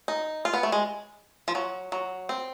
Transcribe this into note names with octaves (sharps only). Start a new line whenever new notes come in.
D#4
F4
B3
A3
G#3
F3
F#3
F#3
C4